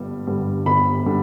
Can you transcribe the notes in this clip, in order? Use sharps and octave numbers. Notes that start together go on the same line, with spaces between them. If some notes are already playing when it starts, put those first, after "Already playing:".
Already playing: G1 G2 D3 G3
G2 D3 G3
G1 B5
D3 G3